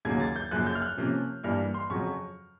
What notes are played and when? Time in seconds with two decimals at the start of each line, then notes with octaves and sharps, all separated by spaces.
0.05 D#2 C#3 F#3 A#3 G#6
0.20 A6
0.36 G6
0.51 F#2 C#3 F3 A#3 F#6
0.66 G6
0.75 F6
0.82 F#6
0.97 C3 F3 A#3 C#4
1.43 G2 E3 G3 A#3 F6
1.74 C6
1.90 F2 C#3 F#3 C#6